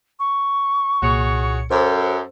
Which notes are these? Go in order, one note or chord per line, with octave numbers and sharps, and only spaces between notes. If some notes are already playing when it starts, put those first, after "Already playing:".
C#6
C2 A#2 F#4 G#4 C#5 C#7
F#2 A4 C5